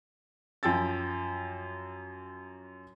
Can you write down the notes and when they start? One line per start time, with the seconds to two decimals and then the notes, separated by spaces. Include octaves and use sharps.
0.63 F#2 F3 G5 E6 A6